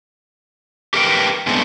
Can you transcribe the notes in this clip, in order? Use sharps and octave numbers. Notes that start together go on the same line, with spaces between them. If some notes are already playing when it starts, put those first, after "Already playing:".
G4 A#4 B4 E5 G5
G2 B2 G#3 A3 B3 C4